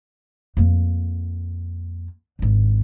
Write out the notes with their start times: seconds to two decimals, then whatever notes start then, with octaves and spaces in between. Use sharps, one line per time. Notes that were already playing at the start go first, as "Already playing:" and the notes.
0.57 F2 A#3
2.39 G#1 D3